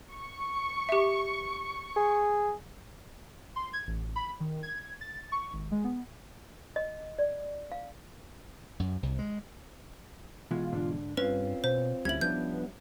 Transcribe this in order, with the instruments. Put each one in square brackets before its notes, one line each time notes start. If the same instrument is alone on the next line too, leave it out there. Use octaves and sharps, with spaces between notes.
[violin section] C#6
[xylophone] G4 E5
[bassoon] G#4
[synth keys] C6
G#6
A1
B5
D#3
G#6
A6
C#6
G#1
G#3
B3
[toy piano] D#5
D5
F5
[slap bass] F#2
C2
G#3
[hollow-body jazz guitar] B2 E3 G#3 [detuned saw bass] F4
[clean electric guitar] G#2 D3 D4
[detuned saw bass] G2 [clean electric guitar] C4 F4 [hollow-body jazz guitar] C#4 [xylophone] B4
[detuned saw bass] B2 [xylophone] C5
[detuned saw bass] D2 [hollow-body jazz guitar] G3 C#4 E4 [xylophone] G#6 F#7
[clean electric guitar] F3 D4 [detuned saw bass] B3 [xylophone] G6